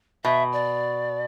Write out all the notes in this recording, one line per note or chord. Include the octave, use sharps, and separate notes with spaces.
B2 E5
D5